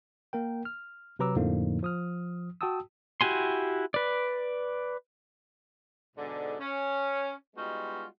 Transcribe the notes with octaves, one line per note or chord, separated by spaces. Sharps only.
A#3 A#4 G5
F6
C3 F#3 B4 A#5 D6 E6
F2 A2 D3 F3 A#3 D#4
F3 D#6 F6
F#4 G5 A5 D#6 E6
E4 F#4 G4 G#5 C6
B4 D5
G#2 B2 D3
C#4
G3 G#3 B3 D#4 F4 F#4